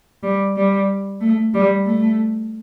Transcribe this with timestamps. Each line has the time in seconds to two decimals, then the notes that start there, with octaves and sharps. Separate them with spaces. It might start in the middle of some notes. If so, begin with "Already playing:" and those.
0.23 G3
0.56 G3
1.21 A3
1.54 G3
1.86 A3